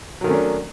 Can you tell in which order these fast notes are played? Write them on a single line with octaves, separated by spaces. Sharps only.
F#3 D#3 A3 C#4 D4